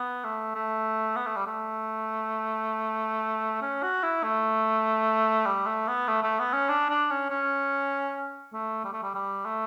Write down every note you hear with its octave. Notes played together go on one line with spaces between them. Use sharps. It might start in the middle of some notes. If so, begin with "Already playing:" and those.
Already playing: B3
A3
A3
B3
A3
G3
A3
C#4
F#4
E4
A3
G3
A3
B3
A3
A3
B3
C#4
D4
D4
C#4
C#4
A3
G3
A3
G3
G3
A3